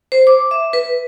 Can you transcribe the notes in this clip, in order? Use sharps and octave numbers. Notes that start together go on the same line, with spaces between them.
C5
D6
E5
B4